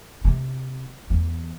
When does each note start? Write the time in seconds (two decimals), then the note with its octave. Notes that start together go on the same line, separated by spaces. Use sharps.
0.25 C3
1.10 E2